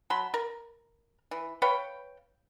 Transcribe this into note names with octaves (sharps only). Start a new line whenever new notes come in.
F#3 A5 B5 C6
A#4
E3
B4 C#5 F5 G5